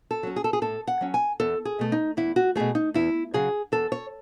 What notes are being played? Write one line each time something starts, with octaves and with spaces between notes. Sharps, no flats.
A4
F#3 C#4
G#4
A4
G#4
A2 A4
F#5
F#3 C#4
G#5
E2 A4
G#4
B2 A3
D#4
E2 E4
F#4
B2 A3 G#4
D#4
E2 E4
C#3 F#3 G#4
E2 A4
C#5